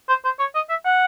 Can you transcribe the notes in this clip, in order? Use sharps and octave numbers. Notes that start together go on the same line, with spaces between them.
C5
C5
C#5
D#5
E5
F#5